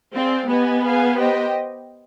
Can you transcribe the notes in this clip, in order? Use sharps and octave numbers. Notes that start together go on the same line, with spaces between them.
C4 G#4 D5 F5
B3 G4 B4 D#5 G#5
G#4 B4 F5 G#5
G4 C5 D#5 G5